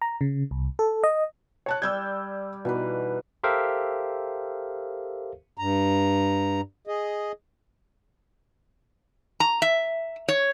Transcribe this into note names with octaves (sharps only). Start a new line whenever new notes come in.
A#5
C#3
C2
A4
D#5
C#5 A5 F#6
G3 D5 E6 G6 G#6
B2 E3 D#4 B4
G4 A4 A#4 C5 E5 F5
G2 A#5
G#4 D#5
A#5
E5
C#5